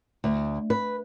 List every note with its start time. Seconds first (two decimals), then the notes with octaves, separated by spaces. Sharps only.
0.24 D2
0.70 B4